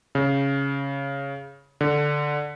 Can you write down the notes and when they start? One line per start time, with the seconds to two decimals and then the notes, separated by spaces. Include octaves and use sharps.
0.15 C#3
1.81 D3